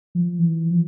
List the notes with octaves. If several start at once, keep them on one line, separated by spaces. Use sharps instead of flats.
F3
E3
F3